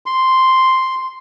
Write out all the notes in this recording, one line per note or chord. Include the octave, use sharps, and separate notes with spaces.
C6